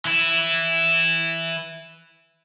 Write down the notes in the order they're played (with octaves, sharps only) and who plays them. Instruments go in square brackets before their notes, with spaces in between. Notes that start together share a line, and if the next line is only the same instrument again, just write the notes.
[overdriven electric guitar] E3 E4